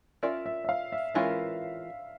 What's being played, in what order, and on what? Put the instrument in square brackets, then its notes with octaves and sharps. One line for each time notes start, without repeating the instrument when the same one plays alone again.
[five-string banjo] C#4 F4 A#4 D5 [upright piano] E5
[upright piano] E5
E5
F5
E5
[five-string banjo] E3 G#3 C#4 F4 A#4 [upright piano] E5